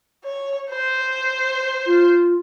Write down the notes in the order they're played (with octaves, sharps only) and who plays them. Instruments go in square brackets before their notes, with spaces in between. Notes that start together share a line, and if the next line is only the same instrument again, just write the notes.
[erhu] C#5
C5
[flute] F4